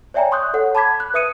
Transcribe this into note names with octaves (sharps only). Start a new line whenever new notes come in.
C#5 D5 E5 G5 G#5 A#5
C6 C#6 D#6 F#6 G6
A4 C#5 F#5
A5 B5 D6 G#6 B6
F#6
B4 E5 D#6 C#7 D#7